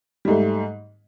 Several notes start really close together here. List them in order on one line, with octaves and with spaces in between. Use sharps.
G3 G#2 A3